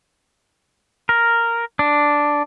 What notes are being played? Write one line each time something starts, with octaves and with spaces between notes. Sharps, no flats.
A#4
D4